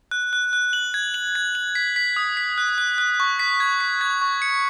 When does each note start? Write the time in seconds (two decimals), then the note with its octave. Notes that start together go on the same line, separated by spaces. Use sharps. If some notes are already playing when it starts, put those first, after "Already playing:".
0.11 F#6
0.33 F#6
0.53 F#6
0.73 F#7
0.94 G#6
1.14 F#7
1.35 G#6
1.55 F#7
1.75 B6
1.96 B6
2.16 D#6
2.37 B6
2.58 F#6
2.78 F#6
2.98 F#6
3.20 C#6
3.39 B6
3.60 G#6
3.80 B6
4.01 G#6
4.21 C#6
4.42 C#7